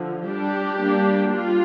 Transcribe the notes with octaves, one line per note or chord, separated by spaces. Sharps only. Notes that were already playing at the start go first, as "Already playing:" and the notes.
Already playing: D3 F3
G3 D4 G4
G3 A#3 D4
G3 F4